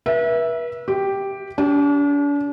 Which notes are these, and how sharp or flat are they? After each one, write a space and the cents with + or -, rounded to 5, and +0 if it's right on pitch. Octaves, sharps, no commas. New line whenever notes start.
B4 -40 E5 +0
G4 +0 G5 +0
D4 -40 G4 +0